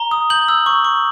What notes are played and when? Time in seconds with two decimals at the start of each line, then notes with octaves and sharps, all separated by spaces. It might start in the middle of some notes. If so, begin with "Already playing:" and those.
Already playing: A#5 G7
0.11 D#6
0.30 G6 F#7
0.48 E6
0.66 C#6
0.85 C#6